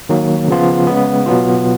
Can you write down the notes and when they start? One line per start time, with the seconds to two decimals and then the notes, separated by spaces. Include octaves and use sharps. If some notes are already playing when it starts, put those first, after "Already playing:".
0.09 D#3 F#3 A#3
0.48 C#3 F3 B3 F4
0.87 C#3 G#3 B3
1.26 B2 F#3 B3 F4